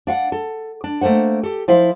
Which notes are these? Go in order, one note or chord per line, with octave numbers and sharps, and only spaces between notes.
D4 F5 F#5
A4
D4
A3 A#3 A4 C5 F#5
G4 A4
F3 E4 C5 F5